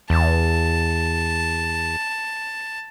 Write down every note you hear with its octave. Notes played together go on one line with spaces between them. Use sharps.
E2 A5